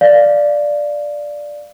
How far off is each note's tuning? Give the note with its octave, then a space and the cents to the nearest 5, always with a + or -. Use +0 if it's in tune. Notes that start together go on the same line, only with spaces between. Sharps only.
D5 +0 F5 +0